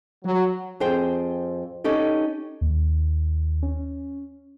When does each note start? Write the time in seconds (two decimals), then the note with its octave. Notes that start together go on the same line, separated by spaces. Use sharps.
0.24 F#3
0.80 F2 G#4 C5 G5
1.84 C#4 D#4 G4 A4
2.61 D#2
3.63 C#4